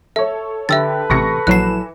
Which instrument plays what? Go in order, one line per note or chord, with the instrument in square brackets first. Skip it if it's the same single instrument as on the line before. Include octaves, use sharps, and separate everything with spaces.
[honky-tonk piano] A4 C#5 [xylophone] E5
[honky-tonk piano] D3 G4 [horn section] A4 B4 [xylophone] E5 E6 A6
[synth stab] A1 C3 [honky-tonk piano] C#6 A#6 C#7
[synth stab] A#1 F#3 E7 [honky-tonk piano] E3 [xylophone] F#6 C7